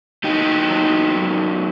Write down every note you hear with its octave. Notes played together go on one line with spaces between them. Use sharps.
F#3 D#4 G4
F#3
F#2